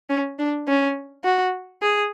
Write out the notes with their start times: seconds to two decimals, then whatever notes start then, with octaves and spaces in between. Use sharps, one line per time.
0.10 C#4
0.39 D4
0.68 C#4
1.24 F#4
1.82 G#4